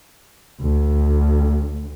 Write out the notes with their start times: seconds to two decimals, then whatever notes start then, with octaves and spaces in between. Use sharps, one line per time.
0.61 D2